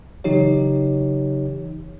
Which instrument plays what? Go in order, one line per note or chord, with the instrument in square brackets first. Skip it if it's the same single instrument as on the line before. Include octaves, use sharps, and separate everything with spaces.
[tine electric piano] C#3 E3 F#3 D#4 G4 C#5